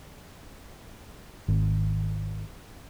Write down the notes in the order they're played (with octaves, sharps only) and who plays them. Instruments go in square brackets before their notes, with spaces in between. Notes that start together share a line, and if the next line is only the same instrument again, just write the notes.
[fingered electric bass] G#1